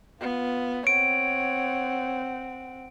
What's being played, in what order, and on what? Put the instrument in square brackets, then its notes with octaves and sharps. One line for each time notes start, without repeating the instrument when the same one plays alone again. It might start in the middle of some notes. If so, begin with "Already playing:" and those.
[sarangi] B3 [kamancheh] F4
[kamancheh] C4 F#5 [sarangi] C#5 [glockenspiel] D7